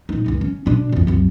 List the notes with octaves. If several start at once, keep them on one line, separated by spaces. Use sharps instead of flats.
D#1 D#4
F#1 C#2
C#4
B2 D4
C2 F2
C2 F#2